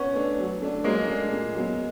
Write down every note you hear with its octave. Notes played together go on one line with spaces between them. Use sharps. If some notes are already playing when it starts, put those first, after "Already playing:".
Already playing: B3 C#4
A3 D4
F#3
A3 D4
F#3 G#3 A#3
A3 D4
A#2
F#3 B3